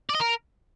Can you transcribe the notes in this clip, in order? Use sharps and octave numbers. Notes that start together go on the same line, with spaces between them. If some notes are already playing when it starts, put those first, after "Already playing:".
D5
D#5
A#4